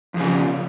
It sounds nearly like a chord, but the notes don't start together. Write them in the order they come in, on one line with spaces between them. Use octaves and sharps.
F2 F3 C#3